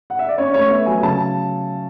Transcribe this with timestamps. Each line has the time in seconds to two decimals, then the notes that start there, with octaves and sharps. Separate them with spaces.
0.10 F#5
0.19 E5
0.29 D5
0.38 C#4 C#5
0.54 A3 C#5
0.70 B3 E5
0.86 F#3 G#5
1.03 C#3 A5